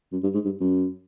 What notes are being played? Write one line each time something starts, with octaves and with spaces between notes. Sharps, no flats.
F#2
G2
G#2
G2
F#2